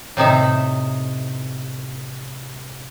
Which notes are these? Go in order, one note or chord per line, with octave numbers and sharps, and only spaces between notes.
A2 C3 D#4 E5